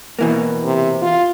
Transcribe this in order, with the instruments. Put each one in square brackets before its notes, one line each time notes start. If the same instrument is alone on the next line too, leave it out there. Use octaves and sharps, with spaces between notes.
[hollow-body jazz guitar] B2 E3 A#3
[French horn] C3
F4